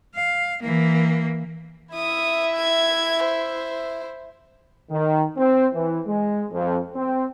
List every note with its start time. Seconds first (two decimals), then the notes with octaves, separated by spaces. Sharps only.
0.15 F5
0.63 E3 A#3
1.95 E4 E5 D#6
2.56 G#6
3.24 C5
4.90 D#3
5.37 C4
5.74 E3
6.06 G#3
6.51 F2
6.94 C4